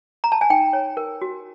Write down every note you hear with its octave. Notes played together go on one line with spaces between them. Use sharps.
A#5
A5
G#5
D#4 G5
C#5
A#4
F#4